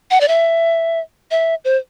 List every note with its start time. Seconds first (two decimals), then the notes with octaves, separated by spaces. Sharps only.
0.11 F#5
0.21 D5
0.28 E5
1.31 E5
1.65 C5